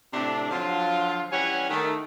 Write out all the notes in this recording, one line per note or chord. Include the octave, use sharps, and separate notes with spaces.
A2 C3 A3 D4
D3 F3 F#3 F4
E3 G3 C#4 C#5 F#5 G#5
D#3 A3